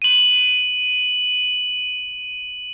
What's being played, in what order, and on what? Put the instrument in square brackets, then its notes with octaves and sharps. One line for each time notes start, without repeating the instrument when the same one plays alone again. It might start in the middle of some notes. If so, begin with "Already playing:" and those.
[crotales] D#7 F#7